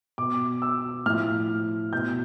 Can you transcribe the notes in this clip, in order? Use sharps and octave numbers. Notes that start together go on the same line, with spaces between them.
B2 D6
E6
A2 F3 F6
B2 G6